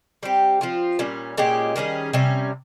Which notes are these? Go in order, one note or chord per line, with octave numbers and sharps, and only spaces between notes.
G3 C4 G4
F3 C4 F4
A#2 G3 C#4
A#2 G#3 C#4 G4
D#3 G3 C#4 G#4
C3 G3 C#4